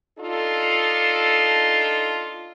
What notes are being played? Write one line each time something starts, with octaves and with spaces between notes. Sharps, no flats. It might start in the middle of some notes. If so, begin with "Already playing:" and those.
D4 D#4 F4 A4